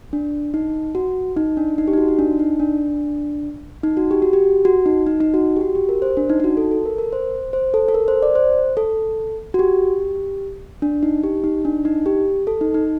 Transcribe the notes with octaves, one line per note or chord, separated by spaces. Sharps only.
D4
D#4
F#4
D#4
D4
D#4
G4
D#4
F#4
D#4
D4
D#4
D4
D#4
F#4
G4
F#4
G4
F#4
D#4
D#4
D#4
F#4
G4
F#4
G4
A#4
C5
D4
D#4
D#4
F#4
A4
A4
A#4
A#4
C5
C5
A4
A4
A#4
C5
D5
C5
A4
F#4
G4
D4
D#4
G4
D#4
D4
D#4
G4
A4
D#4
D#4